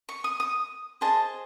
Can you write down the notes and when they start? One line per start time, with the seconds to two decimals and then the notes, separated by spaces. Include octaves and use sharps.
0.09 C#6
0.24 D#6
0.40 D#6
1.01 G#4 C5 D#5 A5